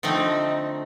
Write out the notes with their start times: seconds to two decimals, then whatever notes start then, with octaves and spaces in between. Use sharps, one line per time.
0.03 D3 F3 A3 C4 D#4